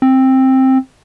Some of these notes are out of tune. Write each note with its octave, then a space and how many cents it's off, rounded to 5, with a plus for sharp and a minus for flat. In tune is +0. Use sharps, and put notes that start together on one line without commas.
C4 +10